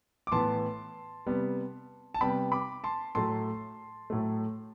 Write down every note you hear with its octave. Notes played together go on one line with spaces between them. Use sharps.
D6
A2 E3 B3 A5 C6
C3 G3 B3
A5
C3 G3 B3 G5 B5
B5 D6
A5 C6
A2 F#3 A3 A5 C6
A2 F#3 A3